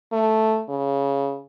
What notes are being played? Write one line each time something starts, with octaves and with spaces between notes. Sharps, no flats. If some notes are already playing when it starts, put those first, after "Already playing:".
A3
C#3